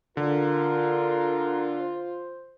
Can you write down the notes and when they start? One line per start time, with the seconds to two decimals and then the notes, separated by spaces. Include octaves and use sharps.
0.17 D3 F4 A#4
1.81 C5